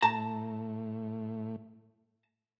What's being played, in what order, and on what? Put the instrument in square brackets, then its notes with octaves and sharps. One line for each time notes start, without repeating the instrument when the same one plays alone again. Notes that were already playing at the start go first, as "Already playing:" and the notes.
[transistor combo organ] A2 [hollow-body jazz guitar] A5 A#5